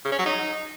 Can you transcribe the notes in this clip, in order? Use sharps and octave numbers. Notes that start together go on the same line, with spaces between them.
C#3
C#4
F#3
D#4